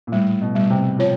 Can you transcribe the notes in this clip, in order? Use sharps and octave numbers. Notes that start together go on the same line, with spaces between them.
A#2
A2 G3
B2
G3
C3
F3 C#5